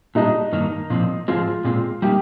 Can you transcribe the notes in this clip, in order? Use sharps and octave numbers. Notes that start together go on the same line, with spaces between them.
A#2 G3 D4 D#4
G2 D#3 A#3
A#2 F3 C4
G#2 F3 G#3 C4 F4
A#2 G#3 C4
G3 A#3 D#4 G4